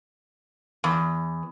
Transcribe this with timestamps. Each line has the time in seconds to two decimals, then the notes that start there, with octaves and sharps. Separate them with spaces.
0.84 E2